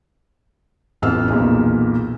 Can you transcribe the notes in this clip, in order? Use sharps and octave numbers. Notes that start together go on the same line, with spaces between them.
A1 F2 B3 E6 F6
B1 E2 A#2